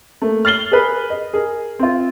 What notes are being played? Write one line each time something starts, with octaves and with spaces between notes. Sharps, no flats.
A3 A#3
F6 A6 C7 F#7 G7
G#4 A#4 B4
D#5
G#4 A#4
C4 F4